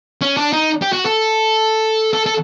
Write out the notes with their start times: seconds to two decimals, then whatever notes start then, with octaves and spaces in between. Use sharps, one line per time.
0.21 C#4
0.37 D4
0.53 D#4
0.82 G4
0.93 F#4
1.06 A4
2.13 A4
2.26 A4